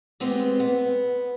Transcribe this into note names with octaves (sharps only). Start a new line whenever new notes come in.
G#3 B3 C4 G4
B3